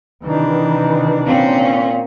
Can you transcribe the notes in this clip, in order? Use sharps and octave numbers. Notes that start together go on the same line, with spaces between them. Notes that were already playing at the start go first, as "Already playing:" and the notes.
C3 D#3 E3 D4
A#2 C4 C#4